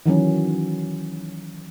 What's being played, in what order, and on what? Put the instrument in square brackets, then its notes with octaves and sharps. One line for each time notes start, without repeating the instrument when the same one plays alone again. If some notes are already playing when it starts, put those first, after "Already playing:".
[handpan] D#3 E3 F#3 C#4